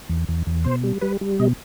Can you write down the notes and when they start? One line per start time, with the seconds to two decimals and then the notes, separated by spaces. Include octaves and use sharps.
0.09 E2
0.28 E2
0.47 E2
0.64 B2 C5
0.83 G3
1.01 G3 B4
1.21 G3
1.40 B2 D#5